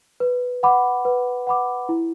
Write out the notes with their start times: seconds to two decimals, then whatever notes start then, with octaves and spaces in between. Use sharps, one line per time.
0.20 B4
0.63 F#5 B5 D6
1.05 B4
1.47 F#5 B5 D6
1.89 E4